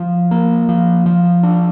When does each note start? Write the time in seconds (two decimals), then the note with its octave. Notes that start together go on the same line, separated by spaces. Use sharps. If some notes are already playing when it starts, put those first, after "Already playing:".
Already playing: F3
0.31 A#3
0.69 F3
1.06 F3
1.43 D4